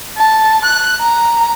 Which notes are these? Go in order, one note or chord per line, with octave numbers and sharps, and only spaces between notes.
A5
F#6
A#5